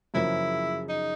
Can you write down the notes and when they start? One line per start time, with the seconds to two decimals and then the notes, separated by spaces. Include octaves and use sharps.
0.14 F#2 C#3 F3 A#3 E4
0.89 D#4